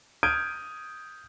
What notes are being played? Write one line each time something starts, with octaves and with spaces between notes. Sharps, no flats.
D#6 F6 G6 G#6 D7 D#7